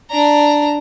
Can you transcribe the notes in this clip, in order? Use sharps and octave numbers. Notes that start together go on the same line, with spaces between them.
D4 A#5